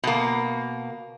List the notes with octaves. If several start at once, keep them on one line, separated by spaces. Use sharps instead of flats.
B2 A#3